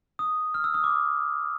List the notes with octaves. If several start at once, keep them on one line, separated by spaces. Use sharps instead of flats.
D#6
F6
E6
D#6
D6